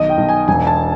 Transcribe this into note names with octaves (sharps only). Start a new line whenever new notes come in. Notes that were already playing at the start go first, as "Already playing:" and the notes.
Already playing: B1 D#3 D#5
G5
B1
G#5
E1 G#5
A5